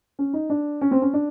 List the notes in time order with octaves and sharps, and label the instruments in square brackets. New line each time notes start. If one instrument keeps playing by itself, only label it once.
[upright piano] C#4
D#4
D4
C#4
C4
C#4
D4